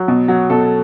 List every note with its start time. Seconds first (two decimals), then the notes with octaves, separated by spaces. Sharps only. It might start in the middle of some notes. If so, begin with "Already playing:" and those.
Already playing: F#3
0.08 B2
0.28 F#3
0.50 B2 A4
0.61 A4